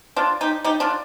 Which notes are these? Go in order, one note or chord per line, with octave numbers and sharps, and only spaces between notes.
D4 F4
D#4 G4
D#4 G4
D4 F4